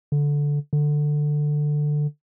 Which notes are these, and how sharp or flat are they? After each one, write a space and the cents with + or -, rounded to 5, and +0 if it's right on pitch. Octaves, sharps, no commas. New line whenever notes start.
D3 -10
D3 +15